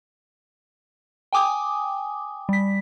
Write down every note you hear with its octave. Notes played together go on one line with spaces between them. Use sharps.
G5 G#5 D6 D#6
G3 B6